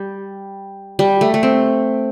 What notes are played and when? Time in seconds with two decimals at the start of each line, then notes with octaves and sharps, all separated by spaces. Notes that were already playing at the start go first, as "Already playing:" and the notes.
Already playing: G3
0.99 G3
1.21 A3
1.34 A3
1.43 C4